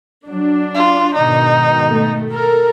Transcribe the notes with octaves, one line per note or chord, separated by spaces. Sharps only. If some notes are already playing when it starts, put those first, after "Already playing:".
F#3 D4
F4
G#2 B2 D#3 D#4
A3
A4 A#4